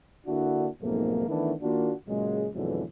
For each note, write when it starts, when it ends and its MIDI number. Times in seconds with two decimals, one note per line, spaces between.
0.26 0.67 50
0.26 0.67 58
0.26 0.67 62
0.26 0.67 64
0.26 0.67 66
0.82 1.24 35
0.82 1.24 41
0.82 1.24 44
0.82 1.24 57
0.82 1.24 58
1.27 1.53 51
1.27 1.53 52
1.27 1.53 57
1.27 1.53 59
1.27 1.53 62
1.27 1.53 64
1.61 1.93 51
1.61 1.93 58
1.61 1.93 62
1.61 1.93 65
1.61 1.93 66
2.08 2.47 46
2.08 2.47 49
2.08 2.47 54
2.08 2.47 56
2.54 2.84 41
2.54 2.84 44
2.54 2.84 47
2.54 2.84 50
2.54 2.84 52
2.54 2.84 54